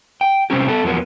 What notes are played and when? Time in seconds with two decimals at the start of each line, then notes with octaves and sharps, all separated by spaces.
0.21 G5
0.50 C3 G3 C4 C#4 G4
0.68 B3 A4
0.84 E2 F3 F#3 A#3 B3